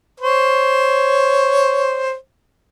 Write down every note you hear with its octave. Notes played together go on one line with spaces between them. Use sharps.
C5 C#5